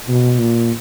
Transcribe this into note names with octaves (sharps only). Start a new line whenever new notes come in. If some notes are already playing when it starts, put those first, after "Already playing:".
B2
A#2